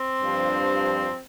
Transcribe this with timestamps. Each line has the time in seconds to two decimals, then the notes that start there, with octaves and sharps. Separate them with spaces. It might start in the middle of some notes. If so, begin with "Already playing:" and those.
Already playing: C4
0.21 G2 F3